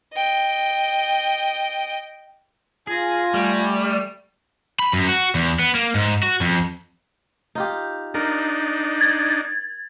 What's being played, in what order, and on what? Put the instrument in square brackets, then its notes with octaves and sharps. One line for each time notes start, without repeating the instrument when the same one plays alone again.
[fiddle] D#5 G5
[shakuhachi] F4 [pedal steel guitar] G#4 [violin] G#5 A#6
[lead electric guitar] G3 [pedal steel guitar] A3
[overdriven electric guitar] B5
F#2
F#4
E2
B3
A#3
G#2
F#4
F2
[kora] D#4 F4 G4
[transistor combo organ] D4 D#4 [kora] A#4
[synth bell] G#6 A6